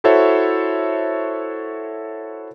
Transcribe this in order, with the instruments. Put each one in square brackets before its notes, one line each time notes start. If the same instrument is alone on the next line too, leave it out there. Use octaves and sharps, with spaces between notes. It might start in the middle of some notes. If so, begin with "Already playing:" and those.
[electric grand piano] E4 F#4 A4 C5 C#5 E5